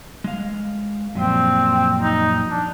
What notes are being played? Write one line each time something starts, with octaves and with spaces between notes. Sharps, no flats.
G#3 F5
F#2 A#2 F3 C4
D#4
D4